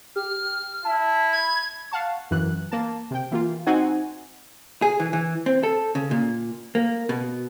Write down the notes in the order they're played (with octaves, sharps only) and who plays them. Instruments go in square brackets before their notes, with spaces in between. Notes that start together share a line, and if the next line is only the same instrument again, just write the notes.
[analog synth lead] G4 [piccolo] F6
[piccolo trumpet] E4 [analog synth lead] A5
[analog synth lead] B5 [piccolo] G#6
[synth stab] F5 F#5 A5 C#6
F#2 E3 F#6
A#3 A5
C3 G5
E3 A#3 F4
C4 D#4 F#4 C5 F#5 G#5
[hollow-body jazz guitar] G#4
E3
E3
C4
A4
C#3
A#2
A#3
B2